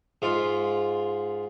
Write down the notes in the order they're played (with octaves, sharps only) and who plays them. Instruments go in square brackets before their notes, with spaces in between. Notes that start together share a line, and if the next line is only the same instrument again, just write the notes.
[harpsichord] G#2 F4